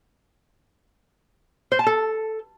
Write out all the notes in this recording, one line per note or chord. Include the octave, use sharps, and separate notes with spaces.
C5
A5
A4